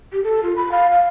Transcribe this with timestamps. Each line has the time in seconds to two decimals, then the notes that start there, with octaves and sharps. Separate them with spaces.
0.13 G4
0.24 A4
0.43 F4
0.56 B5
0.72 F5
0.92 F5